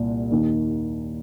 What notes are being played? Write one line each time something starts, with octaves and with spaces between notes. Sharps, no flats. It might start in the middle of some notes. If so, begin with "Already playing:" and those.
Already playing: C2 A#2
D#2 D#3